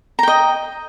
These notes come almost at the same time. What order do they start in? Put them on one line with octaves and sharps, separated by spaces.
A#5 G5 D#5